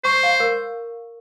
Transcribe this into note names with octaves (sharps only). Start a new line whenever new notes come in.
C5 C#6
F5
A#4